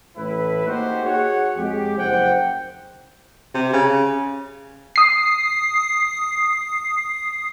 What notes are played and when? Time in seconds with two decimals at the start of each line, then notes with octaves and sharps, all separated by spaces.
0.17 A1 A2 E4 B4
0.67 A#3 D#4 F#4 G4 C5
1.04 F#4 G#4 C#5 F#5
1.57 F2 G#3 G4
1.97 F#1 C5 F#5 G5
3.54 C3
3.73 C#3
4.96 D#6 C7